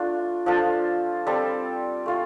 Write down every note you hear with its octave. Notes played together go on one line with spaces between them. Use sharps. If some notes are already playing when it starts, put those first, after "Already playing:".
Already playing: A3 D4 F4
F3 D4 F4 A4
G3 C4 A4
A3 F4